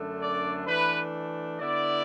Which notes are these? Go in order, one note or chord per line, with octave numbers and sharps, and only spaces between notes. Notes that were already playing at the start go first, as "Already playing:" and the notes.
Already playing: F#2 D3 A3 D4
D5
E3 A3 D4 B4
D3 B3 E4 D5